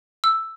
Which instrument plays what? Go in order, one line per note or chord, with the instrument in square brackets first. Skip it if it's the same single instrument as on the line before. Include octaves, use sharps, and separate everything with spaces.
[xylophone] E6